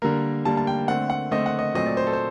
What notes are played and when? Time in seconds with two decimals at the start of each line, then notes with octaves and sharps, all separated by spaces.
0.02 D3 G3 A#3 A#4
0.45 D3 G3 A#3 A5
0.57 A5
0.67 G5
0.88 D3 A3 C4 F#5
1.10 F#5
1.31 D3 A3 C4 D#5
1.46 F#5
1.59 D#5
1.74 A#2 F#3 A3 C4 D#5
1.86 D5
1.97 C5
2.07 A4
2.13 C5